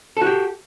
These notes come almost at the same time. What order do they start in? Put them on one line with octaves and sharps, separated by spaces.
A4 F#4 G4